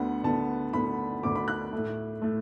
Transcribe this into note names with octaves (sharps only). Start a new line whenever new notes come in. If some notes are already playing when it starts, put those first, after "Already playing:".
Already playing: D2 D3 B3 F#5
D2 D3 B3 A5
D2 D3 B3 B5
D2 D3 B3 D6
B5
F#6
A2 A3
A2 A3